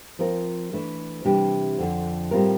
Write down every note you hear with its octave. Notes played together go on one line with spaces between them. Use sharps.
F3 C4 F4 A#4
E3 A3 D4
C3 E3 G3 D4 G4
F2 D3 F3
A2 G3 C4 F4 A#4